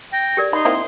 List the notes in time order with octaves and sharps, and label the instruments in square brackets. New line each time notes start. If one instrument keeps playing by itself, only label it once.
[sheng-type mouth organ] G5 [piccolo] A#6
[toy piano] G4 A#4 D5
[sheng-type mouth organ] D#4 [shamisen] B5 [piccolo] C6
[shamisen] A#3 C4 E4